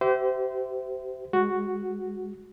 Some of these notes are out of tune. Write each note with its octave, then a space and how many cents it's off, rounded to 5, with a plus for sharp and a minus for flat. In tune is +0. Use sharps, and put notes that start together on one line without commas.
G4 -35 C5 -30 E5 +0
G#3 -20 F#4 +0